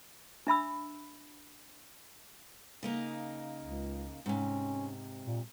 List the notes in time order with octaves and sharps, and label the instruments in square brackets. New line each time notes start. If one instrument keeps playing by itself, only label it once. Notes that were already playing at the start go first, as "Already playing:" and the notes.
[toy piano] D4 E5 B5 E6
[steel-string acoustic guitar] C#3 A#3 D#4
[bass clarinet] C#2
[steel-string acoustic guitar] G#2 C3 [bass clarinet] C#4
[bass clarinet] A#2